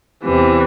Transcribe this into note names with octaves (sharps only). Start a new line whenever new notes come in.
E2 C3 E3